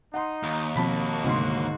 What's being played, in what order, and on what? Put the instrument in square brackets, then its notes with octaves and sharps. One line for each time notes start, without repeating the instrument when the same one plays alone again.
[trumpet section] D#4 [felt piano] F#5 C6
[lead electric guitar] D#2 [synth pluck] F5 B5
[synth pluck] B2 F3 C4 [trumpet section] A#3 F#4 [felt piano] A5 B5 B6
[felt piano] D2 G#2 C6 [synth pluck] C3